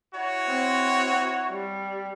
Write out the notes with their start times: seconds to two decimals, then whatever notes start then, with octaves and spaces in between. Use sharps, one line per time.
0.14 E4 F#4 C#5
0.47 C4
1.50 G3